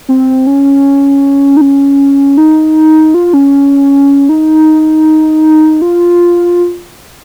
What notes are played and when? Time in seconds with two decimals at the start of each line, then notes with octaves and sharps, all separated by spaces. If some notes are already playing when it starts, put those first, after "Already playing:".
0.09 C4
0.47 C#4
1.57 D#4
1.61 C#4
2.37 D#4
3.14 F4
3.33 C#4
4.29 D#4
5.82 F4